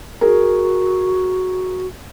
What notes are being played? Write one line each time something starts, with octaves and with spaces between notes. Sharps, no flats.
F#4 G#4 A#4